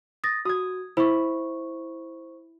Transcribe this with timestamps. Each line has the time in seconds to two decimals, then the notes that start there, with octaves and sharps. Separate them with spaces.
0.24 D#6 A6 A#6
0.45 F#4 D#6 G#6
0.97 E4 C5 C#6